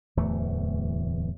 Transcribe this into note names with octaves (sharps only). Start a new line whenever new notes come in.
D1 E2 E3 A3